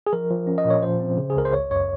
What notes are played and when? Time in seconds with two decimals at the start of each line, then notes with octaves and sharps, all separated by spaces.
0.07 G#4
0.13 F3 A#4
0.30 F3
0.47 C#4
0.58 D#5
0.65 A#2
0.70 C#5
0.82 F3 C5
1.00 C4
1.17 C#3
1.30 G#4
1.36 C#2 A#4
1.45 C5
1.53 G#1 C#5
1.71 F#2 C#5